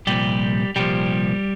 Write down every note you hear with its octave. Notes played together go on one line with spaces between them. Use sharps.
C2 A#2 F3 G3 G4
C2 A#2 F3 G3 G4